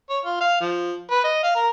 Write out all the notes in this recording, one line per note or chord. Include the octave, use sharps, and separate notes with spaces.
C#5
F4
F5
F3
B4
D#5
F5
A#4